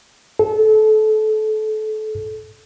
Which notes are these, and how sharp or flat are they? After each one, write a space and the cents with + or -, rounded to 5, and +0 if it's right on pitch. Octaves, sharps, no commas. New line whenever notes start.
A4 -30